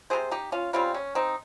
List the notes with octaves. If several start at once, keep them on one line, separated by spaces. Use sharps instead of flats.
C3 G3 C4 G#4 C5
D#4 G4
C#4 F4
C#3 G3 C4 C#4 F4
C#4
C4 D#4